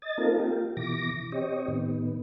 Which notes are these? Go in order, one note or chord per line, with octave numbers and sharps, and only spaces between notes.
D#5 A6
A#3 C4 D#4 F4 A4 A#4
A#3 F4 G4
B2 E3 D6 A#6
C4 G4 C#5 D#5
A2 D#3 B3